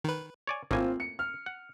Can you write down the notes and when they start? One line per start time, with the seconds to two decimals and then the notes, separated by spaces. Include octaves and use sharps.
0.04 D#3 B4
0.47 C#5 D5 G#5
0.71 G#1 A2 A#3 C4 F4 G#5
1.00 C#7
1.19 F6
1.46 F#5